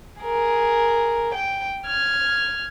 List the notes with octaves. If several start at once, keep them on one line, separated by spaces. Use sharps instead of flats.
G#4 A#4
G5
F6 G#6